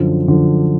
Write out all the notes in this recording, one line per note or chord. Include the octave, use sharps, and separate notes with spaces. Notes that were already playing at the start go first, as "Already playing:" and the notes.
Already playing: F#2 D3 F3
F#2 D3 F3